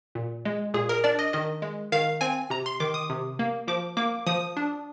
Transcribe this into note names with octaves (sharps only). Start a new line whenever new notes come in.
A#2
G#3
A#2 G#4
A#4
D4 D5
D#5
D#3 D#5
G#3
D#3 F5
C4 G#5
C3 A#5
C6
D#3 D6
D#6
C3
A#3
F3 D6
A#3 D6
F3 D#6
D4